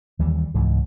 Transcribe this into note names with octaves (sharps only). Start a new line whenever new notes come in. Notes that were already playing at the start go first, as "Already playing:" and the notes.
D#2 E3 G3
C#2 G#2 E3